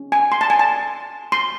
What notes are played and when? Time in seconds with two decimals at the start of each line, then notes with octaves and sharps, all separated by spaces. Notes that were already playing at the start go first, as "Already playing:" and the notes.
Already playing: C#4
0.12 G#5
0.32 C6
0.41 A5
0.50 G#5
0.59 A5
1.32 C6